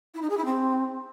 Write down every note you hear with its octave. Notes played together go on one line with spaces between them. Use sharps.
E4
D#4
G#4
E4
C4